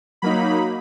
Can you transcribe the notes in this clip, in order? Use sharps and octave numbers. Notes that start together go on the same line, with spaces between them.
F#3 A#3 D#4 B5